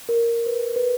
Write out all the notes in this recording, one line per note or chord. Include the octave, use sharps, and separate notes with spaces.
A#4
B4
B4